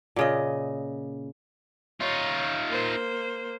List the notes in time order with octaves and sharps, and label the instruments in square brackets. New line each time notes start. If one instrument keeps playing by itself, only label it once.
[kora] A#2 C#3 D#5
[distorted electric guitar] D#4 F4 [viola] C#5
[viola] A#3 C5